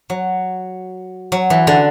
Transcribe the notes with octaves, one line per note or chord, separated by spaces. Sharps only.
F#3
F#3
E3
D3